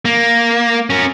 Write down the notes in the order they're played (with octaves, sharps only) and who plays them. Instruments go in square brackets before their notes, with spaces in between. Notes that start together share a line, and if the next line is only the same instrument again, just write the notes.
[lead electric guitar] A#3
C#4 A#4